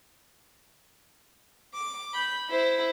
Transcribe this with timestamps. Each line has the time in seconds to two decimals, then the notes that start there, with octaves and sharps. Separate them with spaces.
1.74 D6
2.14 B5 G6
2.50 E4 C5